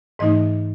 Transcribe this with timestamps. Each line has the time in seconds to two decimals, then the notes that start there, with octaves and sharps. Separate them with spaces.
0.19 G#2 E3 A3 D#4 D#5